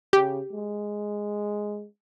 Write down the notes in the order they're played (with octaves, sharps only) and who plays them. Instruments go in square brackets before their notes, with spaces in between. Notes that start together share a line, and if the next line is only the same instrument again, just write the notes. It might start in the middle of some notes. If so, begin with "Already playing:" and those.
[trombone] C#3 [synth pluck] G4
[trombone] G#3